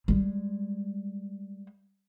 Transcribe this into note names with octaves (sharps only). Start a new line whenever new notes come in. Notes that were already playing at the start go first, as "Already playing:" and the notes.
G3 G#3